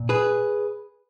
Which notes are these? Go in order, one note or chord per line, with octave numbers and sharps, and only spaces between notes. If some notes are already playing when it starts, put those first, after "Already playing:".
Already playing: A#2
G#4 B4